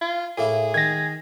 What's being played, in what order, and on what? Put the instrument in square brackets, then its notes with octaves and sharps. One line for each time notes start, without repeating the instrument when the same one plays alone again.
[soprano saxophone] F4
[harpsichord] A2 A#3 E4 [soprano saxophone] G#4
[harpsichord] D#3 [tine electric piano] G#6 A#6